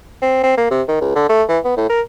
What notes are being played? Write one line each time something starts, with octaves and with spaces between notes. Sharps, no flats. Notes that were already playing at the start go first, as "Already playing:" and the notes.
C4
C4
A#3
C3
D#3
C#2
D3
A3
E3
B3
A2
A#4